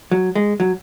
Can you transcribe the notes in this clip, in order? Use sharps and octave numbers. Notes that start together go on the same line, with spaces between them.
F#3
G#3
F#3